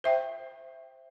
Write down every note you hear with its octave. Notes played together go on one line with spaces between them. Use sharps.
C5 E5 G5